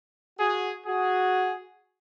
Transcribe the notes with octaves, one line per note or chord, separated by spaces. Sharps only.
F#4 G#4
F#4 G#4